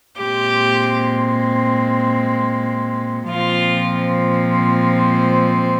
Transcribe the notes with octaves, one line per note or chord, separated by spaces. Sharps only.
A#2 G#3 C4 G4
A#2 F3 G#3 C4 F4